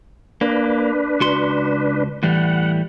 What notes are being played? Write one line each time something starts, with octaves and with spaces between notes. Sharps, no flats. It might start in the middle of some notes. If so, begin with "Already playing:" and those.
A#3 D4 B4
C#2 F#4 C6
A2 E3 G3 F#5